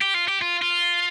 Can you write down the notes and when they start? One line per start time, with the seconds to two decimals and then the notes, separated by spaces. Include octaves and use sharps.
0.02 G4
0.15 F4
0.28 G4
0.42 F4
0.62 F4